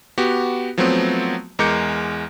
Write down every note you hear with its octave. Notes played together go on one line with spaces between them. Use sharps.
B3 F#4 G4
F3 F#3 A3 B3 C4
E2 G#3 A#4 D6 G6 C#7